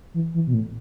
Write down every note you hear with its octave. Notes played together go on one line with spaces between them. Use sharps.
E3
E3
B2
A2